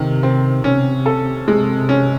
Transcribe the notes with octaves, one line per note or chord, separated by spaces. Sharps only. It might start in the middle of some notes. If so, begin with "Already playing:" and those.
Already playing: C3 D#3
C4
C3 C#4
A4
G#3
C#4